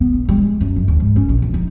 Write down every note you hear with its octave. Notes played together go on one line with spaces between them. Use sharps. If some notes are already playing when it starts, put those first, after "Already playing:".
B3
A#1
G3
G#3
F#2
G1
D#2
G#2
C#4
A#1
F3
D#4